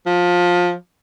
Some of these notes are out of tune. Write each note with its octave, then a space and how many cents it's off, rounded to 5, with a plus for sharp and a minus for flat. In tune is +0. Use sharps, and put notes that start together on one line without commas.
F3 +20